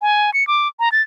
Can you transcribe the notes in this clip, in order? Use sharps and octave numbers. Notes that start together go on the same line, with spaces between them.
G#5
C#7
D6
A#5
A6